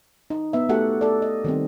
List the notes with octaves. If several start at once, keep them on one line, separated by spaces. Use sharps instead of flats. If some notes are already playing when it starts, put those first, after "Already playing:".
D#4
B3 E5
A3 F#4 G4 A4 F#5
A4 D5
D#5
D#3 G3 C4